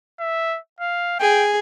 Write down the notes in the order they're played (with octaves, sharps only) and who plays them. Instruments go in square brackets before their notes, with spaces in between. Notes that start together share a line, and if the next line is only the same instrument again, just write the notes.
[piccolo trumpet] E5
F5
[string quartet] G#4 [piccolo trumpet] G5